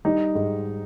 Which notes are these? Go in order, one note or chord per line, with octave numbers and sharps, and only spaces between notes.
G3 D#4
G#2